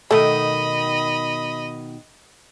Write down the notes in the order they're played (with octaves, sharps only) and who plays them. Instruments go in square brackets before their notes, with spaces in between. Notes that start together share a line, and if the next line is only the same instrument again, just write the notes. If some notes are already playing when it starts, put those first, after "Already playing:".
[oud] B2 D#3 [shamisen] A3 [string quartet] D#5 B5